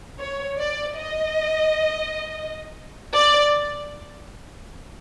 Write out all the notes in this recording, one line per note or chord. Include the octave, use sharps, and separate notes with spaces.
C#5
D5
D#5
D5